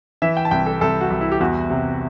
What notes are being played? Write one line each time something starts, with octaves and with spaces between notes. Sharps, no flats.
E3 E5
G5
A5
C2 G5
A4
C2 A4
F#4
C2
E4
G4
E2 F#4
C3